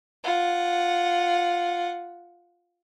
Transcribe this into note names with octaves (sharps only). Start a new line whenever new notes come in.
F4 F#5